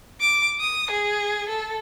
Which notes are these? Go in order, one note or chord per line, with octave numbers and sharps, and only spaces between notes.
D6
D#6
G#4
A4